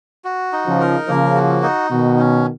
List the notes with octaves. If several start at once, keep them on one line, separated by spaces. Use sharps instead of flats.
F#4
D#4
C#3 F3
A#4
C#3 F3 A#3
F#4
D#4
B2 D#3 F#4
C#4